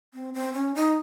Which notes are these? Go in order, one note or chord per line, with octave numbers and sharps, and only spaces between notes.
C4
C4
C#4
D#4